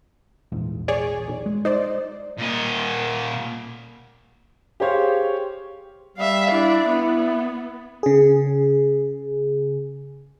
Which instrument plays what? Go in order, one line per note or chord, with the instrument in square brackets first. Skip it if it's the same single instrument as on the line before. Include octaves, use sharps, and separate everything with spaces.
[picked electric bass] A#1 E2 G#2
[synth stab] G#4 C#5 D5
B1
[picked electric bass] G#3
[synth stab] D#4 C5 D5
[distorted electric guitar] A#2 D#5
[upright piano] G4 G#4 C5 C#5 F5
[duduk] G3 [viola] E5 F5
[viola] D4 [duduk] E4
[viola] B3 [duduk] E4
[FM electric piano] C#3 G#4